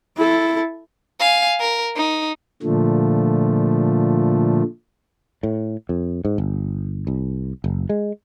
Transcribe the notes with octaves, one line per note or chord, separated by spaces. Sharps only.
E4 A4
F5 G#5
A#4
D#4
A#2 D3 F3 A3
A2
F2
G#2
G1
C2
F#1
G#3